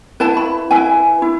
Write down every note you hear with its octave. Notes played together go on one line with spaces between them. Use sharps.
E4 B4 A5
B5
E4 B4 G#5
E4